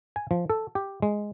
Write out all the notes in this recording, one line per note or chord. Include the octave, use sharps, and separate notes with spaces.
G#5
F3
A4
G4
G#3